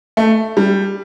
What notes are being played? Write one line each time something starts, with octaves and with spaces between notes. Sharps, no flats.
A3
G3